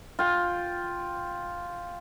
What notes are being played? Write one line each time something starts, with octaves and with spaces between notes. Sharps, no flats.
F4 G5